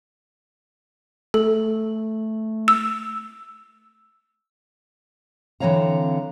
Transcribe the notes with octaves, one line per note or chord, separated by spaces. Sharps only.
A3 A4
E6
D3 E3 C4 C#5 F5 A#5